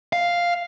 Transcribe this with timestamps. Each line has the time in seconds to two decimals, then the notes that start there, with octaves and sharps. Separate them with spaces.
0.13 F5